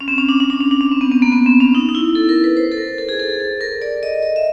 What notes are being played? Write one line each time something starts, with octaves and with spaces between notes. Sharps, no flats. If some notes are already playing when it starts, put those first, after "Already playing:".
C#4
C4
C#4
D4
D4
D4
C#4
D4
C#4
C4
B3
B3
A#3
B3
C4
C#4
D#4
D#4
E4
A4
A#4
B4
C5
A4
A#4
A4
G#4
A4
G#4
A4
A#4
D5
D#5
D#5
E5